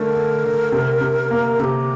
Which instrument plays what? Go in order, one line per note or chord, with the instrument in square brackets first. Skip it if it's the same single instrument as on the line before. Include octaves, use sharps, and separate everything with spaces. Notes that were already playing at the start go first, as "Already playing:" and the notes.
Already playing: [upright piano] D3 A3 A4 [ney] A#4
[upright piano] A4
D3
C3
C3
A#3
[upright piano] C3 [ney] A4
[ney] G4